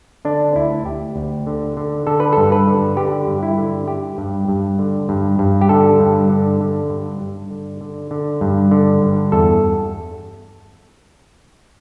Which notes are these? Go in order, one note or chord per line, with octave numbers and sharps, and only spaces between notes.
D3 D4
D2 E4
D2 G4
D2
D3
D3
D3 A4
B4
G2 A4
B4
D3
D3 G4
G2
E4
D3
G2 G4
G2
G2
D3
G2
G2
G4
D3 A4
G2
D3
D3
G2
G2
D3
D3
D3
G2
D3
G2
E2 A4